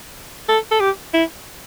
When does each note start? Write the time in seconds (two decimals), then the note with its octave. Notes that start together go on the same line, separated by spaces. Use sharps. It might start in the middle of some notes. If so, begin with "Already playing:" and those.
0.49 A4
0.71 A4
0.80 G4
1.14 E4